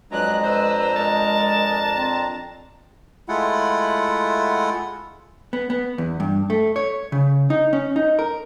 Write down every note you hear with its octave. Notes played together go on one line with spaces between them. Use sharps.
F2 F#3 G#3 D4 B4 A#5 F#6
B4 C5 E6
G#3 A#4 A5
C4
G#3 A3 E4 F4 F#5
B3
B3
E2
G2
A3
C#5
C#3
D#4
C#4
D#4
A#4